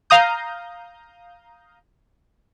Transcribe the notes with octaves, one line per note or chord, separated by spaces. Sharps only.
F5 A#5 D#6 G6